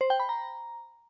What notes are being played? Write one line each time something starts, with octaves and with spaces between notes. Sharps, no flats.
C5
G5
B5
A#5